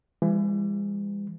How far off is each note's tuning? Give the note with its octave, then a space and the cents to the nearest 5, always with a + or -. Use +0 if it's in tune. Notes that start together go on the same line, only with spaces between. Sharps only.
E3 +35 G#3 -45